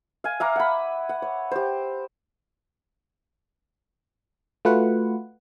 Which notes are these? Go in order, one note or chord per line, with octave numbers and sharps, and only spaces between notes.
F5 G#5
E5 F5 A#5 D6
F#5 B5
F#5
C#5
G4 C5
A3 F4 F#4 B4 F#5